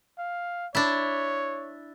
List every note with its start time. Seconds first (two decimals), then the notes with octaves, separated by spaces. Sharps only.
0.18 F5
0.75 D4 E4 C#5